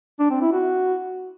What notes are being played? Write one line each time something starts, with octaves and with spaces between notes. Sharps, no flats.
D4
C4
E4
F#4